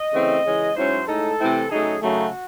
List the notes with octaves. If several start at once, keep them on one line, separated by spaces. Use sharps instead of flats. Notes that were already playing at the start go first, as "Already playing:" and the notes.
Already playing: D#5
C#3 E3 A3 C4
C#3 E3 G#3 C#4
G#2 F#3 C#4 E4 C5
A2 G#3 D#4 A4
C3 E3 A3 C4 E4
C#3 F#3 A3 D#4 G#4
F#2 C#3 F#3 A3 D#4 F#4